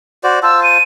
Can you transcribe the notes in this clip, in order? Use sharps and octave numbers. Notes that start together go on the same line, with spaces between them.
F#4 C5 D5
F4 C5 A5 E6
D#7